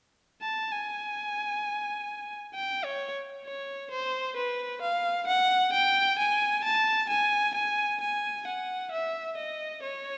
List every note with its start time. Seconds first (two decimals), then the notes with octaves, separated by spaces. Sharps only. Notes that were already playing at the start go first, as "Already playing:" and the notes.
0.42 A5
0.72 G#5
2.55 G5
2.85 C#5
3.45 C#5
3.91 C5
4.37 B4
4.82 F5
5.27 F#5
5.73 G5
6.19 G#5
6.64 A5
7.09 G#5
7.55 G#5
8.01 G#5
8.47 F#5
8.92 E5
9.37 D#5
9.83 C#5